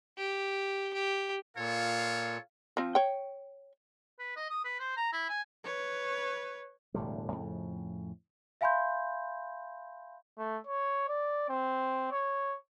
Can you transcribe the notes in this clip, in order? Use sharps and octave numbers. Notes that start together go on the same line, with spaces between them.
G4
G4
A#2 F4 A4 C#5 F5
F3 C4
C#5 G5
B4
D#5
D#6
B4
C5
A#5
E4
G#5
B4 C#5
E1 A2 D3 G3
F2 A2 C#3
E5 F5 G#5 B5 C6 G6
A3
C#5
D5
C4
C#5